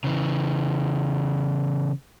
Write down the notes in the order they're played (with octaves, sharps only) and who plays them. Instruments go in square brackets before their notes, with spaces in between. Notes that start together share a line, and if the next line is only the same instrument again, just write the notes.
[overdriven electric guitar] C#3 E3